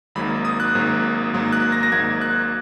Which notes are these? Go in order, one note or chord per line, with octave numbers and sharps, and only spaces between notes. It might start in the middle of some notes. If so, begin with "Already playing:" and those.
G#1 G#2 F#3 A#3 B5
D#6
F#6
G#1 G#2 F#3 A#3
G#1 G#2 F#3 A#3
F#6
A#6
A#6
G#1 G#2 F#3 A#3 G#6
F#6